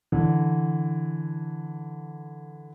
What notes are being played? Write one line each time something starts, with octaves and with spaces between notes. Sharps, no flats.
D3 E3